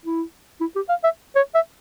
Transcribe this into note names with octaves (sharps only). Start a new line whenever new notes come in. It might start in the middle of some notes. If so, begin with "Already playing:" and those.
E4
E4
G4
F5
E5
C#5
E5